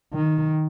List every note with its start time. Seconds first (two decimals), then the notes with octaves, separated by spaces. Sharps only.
0.13 D#3